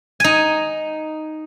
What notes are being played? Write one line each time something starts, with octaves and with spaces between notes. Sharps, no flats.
D#4 G#5